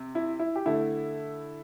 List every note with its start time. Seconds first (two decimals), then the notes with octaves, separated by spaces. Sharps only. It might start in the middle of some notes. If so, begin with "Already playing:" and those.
Already playing: C3
0.15 E4
0.39 E4
0.56 G4
0.66 D3 A3 E4